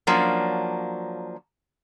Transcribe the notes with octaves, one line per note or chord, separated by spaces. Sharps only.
F3 F#3 A#3 C#4 D4